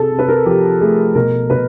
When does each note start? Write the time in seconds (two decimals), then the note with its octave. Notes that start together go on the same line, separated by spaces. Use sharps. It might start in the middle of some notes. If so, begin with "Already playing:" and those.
Already playing: C3 G#4 A4
0.11 C3
0.19 B4
0.28 A#4
0.45 F3 G4
0.81 A3 G#4
1.15 B2 A#4
1.50 B2 B4